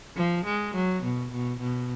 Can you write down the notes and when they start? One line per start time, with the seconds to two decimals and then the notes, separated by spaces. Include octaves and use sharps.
0.16 F3
0.45 G#3
0.75 F#3
1.03 B2
1.32 B2
1.60 B2